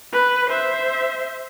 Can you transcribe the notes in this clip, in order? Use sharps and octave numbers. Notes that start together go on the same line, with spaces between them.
B4
C5 E5